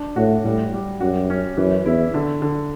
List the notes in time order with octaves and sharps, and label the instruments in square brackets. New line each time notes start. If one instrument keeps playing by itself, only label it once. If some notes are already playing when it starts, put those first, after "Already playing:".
Already playing: [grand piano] D4
[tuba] A2 [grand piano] F#4
[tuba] A2 [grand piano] G3
[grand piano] G3
[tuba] F#2 [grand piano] F#4
[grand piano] C#4
[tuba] F#2 [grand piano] E3
[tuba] E2 [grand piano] E4
[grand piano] D3
D3